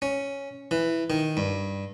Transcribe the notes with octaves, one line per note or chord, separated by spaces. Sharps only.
C#4
E3
D#3
G2